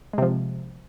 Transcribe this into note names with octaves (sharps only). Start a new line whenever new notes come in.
C3 F3 G#3